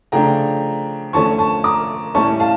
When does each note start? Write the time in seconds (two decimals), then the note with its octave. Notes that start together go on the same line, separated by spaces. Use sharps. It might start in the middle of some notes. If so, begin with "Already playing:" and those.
0.12 C#3 F3 A3 D4 G5 A#5
1.13 D3 F3 A3 C#4 A5 C#6
1.38 A5 C#6
1.64 A#5 D6
2.15 A2 G3 C#4 A5 C#6
2.40 F5 A5